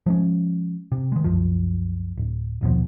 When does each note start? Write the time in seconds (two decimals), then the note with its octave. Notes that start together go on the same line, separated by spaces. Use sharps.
0.06 F3 G#3 C#4
0.92 C3
1.12 D#3 G#3
1.24 C2 F#2 F3
2.17 D1
2.61 A#1 D#2 B2 F3